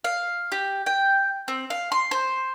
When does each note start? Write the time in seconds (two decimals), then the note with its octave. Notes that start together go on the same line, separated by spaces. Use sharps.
0.04 F5
0.52 G4
0.86 G5
1.48 C4
1.70 F5
1.92 C6
2.11 C5